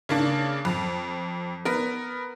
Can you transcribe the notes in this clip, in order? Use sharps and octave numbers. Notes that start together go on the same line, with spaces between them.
C#3 A#3 D4
F2
B3 A#4